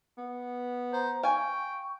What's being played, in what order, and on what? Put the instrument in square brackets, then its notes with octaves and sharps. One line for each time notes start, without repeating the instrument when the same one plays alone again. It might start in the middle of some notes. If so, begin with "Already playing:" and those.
[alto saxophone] B3
[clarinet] C5 [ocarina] A#5
[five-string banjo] F5 G#5 [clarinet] G5 [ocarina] C#6